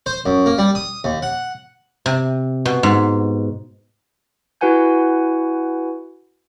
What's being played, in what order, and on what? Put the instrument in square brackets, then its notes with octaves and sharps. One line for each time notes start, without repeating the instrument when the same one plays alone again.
[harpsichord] C5
F#2
A#3
G3
D#6
D#2
F#5
[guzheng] C3
B2
G#2
[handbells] E4 F#4 B4 F#5 G#5 G6